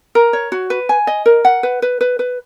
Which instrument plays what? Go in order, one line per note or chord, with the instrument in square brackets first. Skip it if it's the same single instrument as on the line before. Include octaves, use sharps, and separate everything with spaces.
[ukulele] A#4
C#5
F#4
B4
G#5
D#5
A#4
F#5
B4
B4
B4
B4